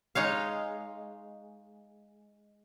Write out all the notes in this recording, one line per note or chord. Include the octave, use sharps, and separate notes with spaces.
G#3 D#4 C#5 F5